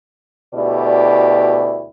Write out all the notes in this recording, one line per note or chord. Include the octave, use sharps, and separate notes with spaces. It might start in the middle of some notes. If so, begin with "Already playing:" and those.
D2 B2 E4 G4 D5